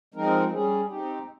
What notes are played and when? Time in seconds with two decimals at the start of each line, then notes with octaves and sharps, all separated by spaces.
0.14 F3 G#3 C4 D#4 A#4
0.52 G3 C#4 G#4
0.89 C4 D#4 G4